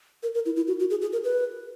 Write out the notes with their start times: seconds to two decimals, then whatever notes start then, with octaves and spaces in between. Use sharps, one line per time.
0.23 A#4
0.35 A#4
0.46 E4
0.56 E4
0.68 F#4
0.79 F#4
0.90 G#4
1.02 G#4
1.13 A#4
1.24 B4